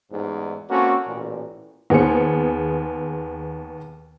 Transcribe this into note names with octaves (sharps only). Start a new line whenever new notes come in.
A1 E2 G#2
A#3 C4 C#4 F#4 A4
A1 A#2
D#2 B3 G#4 C5 C#7